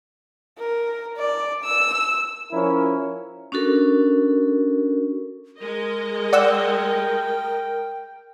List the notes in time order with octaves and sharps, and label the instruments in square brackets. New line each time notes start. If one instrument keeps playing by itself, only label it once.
[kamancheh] A#4
D5
E6
[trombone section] F3 C#4 E4 A#4
[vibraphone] C#4 D4 F#4 A4 A#4
[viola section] G#3 D#5 [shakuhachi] A#4
[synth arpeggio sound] D5 F#5 E6 [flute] G5